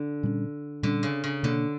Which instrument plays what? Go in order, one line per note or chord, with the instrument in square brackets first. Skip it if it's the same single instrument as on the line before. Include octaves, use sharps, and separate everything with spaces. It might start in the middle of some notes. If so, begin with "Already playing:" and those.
Already playing: [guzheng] D3
[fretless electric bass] A#2 G3 C#4
[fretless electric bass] A#2 G3 C#4 [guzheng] D3
[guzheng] C#3
C#3
[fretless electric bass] B2 A#3 D4 [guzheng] D3